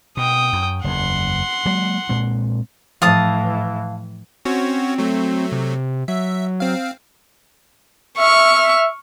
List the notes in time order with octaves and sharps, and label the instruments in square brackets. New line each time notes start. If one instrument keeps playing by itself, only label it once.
[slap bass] B2 [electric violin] G5 D#6
[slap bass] F#2
[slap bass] F#1 E2 [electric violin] F#5 C6
[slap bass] F#3 G#3 A#3
A#2 G#3 C4
[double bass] A2 E3 [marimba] F3 [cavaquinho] F5 A5 D#6
[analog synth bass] C4 [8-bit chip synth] C#4 F#4 C#5
[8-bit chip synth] F#3 A3
[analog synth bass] C3
[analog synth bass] F#3 [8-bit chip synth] E5
[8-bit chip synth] C4 F5
[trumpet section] E5 [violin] C#6 F6